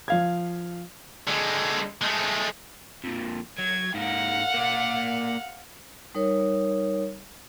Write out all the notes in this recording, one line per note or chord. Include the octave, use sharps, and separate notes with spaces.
F3 F5 G#6
D3 G#3
G#3 A3
F2 A#2
F#3 G#6
G#2 A#3 F5 F#5
A#3 D5
G3 D#4 A#4 C#5